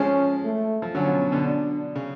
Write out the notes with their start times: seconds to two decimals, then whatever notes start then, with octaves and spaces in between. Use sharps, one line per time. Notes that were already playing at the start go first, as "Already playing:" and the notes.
Already playing: F3 G#3 C#4
0.44 A3
0.82 F3
0.94 D3 F#3 C#4
1.07 B2
1.32 B2 D3
1.45 D4
1.96 C#3